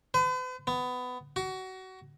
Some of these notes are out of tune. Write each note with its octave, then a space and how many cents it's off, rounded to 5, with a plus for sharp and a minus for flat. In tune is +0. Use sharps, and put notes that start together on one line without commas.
B4 +45
B3 +20
F#4 +25